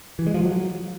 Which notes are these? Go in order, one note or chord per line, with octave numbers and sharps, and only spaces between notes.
E3
G#3
F3
F#3